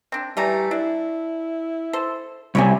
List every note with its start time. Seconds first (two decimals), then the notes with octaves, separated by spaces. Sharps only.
0.12 C4 D4
0.37 E3 G3 A3 A#5
0.71 D4 E4
1.93 A4 C5
2.55 C2 C3 C#5 D5 G#5